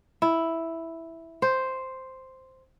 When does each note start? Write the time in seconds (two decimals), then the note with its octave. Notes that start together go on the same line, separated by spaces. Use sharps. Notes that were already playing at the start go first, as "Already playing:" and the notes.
0.22 E4
1.42 C5